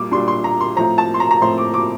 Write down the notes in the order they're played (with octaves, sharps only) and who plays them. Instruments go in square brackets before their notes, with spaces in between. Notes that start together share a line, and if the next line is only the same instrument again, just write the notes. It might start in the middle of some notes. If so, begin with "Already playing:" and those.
Already playing: [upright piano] A#2 G3 D6
A#2 G3 D4 C6
C6
A#5
C6
A2 F3 C4 A#5
A5
C6
A#5
A#5
A2 F3 C4 C6
D6
D6